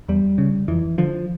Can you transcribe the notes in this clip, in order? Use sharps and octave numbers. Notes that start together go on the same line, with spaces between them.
E2 G3
C#3
F2 E3
D3 F3